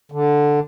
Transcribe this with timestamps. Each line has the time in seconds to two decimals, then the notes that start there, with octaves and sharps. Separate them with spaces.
0.12 D3